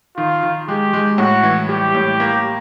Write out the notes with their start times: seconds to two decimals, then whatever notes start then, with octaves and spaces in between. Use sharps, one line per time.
0.16 D#3 F4
0.43 D#3
0.68 G#3 G4
0.93 G#3
1.18 A2 F#4
1.43 E3
1.69 G3 G4
1.95 A2
2.20 A#3